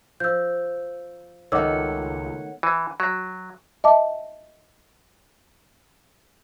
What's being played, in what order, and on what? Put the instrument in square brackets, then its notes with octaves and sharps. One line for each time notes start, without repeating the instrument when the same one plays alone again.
[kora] F3 [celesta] E6 G6
[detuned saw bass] C#2 [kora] D#3 A3 B3 [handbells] C#5 F#5 [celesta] D6 E6
[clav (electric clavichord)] E3
F#3
[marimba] D#5 E5 A5 D6